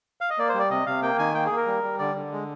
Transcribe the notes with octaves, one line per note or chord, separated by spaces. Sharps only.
F5
D#5
A#3 D5
C5
G3 D5
C3 D#5
C3 F5
A#3 G5
D#3 G#5
A#3 G5
G#4
A#3
A#4
G3
G3
D3 D5
D3
G#3